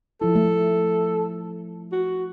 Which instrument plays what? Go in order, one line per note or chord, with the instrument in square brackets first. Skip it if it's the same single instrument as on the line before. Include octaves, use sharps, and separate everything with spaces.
[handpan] F3 E4 [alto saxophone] A4
[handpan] A3
[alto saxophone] F#4